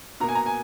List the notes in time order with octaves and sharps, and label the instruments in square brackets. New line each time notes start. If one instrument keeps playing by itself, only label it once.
[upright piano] B2 A#3 A#5
G#5
A#5
G#5